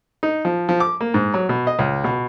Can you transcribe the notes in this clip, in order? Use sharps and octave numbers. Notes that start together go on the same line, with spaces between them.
D#4
F3
F3
D6
A#3
G#2
F#3
B2
D#5
C#2
B2